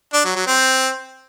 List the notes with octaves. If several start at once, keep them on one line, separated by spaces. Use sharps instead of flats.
D4
F#3
F#3
C4